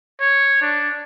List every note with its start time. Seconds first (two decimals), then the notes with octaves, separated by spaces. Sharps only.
0.21 C#5
0.62 D4